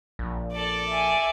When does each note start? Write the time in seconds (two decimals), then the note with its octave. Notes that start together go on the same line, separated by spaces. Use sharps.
0.19 A#1
0.52 A4 D5
0.89 E5 G#5